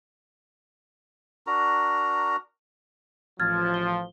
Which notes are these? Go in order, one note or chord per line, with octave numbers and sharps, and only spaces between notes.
D4 F#4 A#4 A#5
A1 F3 F6 G#6 A6
G7